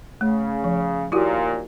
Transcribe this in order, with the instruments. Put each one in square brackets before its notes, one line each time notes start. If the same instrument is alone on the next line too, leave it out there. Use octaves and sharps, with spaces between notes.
[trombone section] C#3 [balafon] A3
[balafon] F3
[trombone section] D#2 A#2 [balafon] E4 F#4 G4